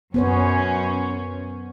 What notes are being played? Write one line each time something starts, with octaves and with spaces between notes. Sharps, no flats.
F#2 B3 C#4 C5 C#5